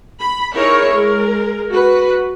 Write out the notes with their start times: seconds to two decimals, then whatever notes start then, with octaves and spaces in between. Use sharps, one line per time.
0.21 B5
0.54 D#4 E4 G#4 A#4 C#5
0.92 G#3 A#4
1.71 F#4 B4